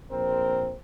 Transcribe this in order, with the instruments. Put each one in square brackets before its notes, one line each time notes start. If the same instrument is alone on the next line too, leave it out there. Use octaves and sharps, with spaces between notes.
[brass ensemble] A#1 C4 A#4 C5